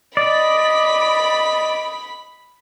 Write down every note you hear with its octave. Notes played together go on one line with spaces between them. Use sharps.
D5 D#5 B5 B6